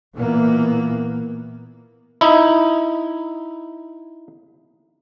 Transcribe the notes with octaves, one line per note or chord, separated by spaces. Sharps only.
A#2 E3 A#3 B3
D#4 E4